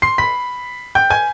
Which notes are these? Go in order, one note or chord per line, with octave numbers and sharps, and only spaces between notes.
C6 C7
B5 B6
G5 G6
G#5 G#6